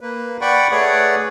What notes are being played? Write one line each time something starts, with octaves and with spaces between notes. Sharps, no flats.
A#3 B4
D5 F#5 G5 B5 C#6
A3 G#4 B4 C#5 D5 F#5